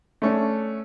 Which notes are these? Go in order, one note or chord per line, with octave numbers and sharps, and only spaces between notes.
A3 C#4 D4